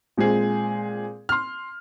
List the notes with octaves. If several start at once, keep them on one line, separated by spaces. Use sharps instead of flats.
A#2 G#3 C4 G#4
C6 F6